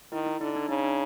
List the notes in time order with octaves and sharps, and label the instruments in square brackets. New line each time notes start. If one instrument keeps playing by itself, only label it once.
[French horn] D#3 [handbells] E4
[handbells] D#4
[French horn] D3 [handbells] D#4
[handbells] D4
[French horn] C#3 [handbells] D#4
[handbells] D4